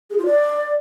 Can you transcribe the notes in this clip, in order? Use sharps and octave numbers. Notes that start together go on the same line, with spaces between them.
G#4
F4
D5